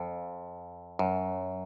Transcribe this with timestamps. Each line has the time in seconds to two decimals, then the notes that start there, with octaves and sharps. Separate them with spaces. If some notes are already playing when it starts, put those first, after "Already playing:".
Already playing: F2
0.99 F#2